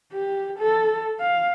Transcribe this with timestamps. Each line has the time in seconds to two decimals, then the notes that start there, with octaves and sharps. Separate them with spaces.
0.13 G4
0.59 A4
1.20 F5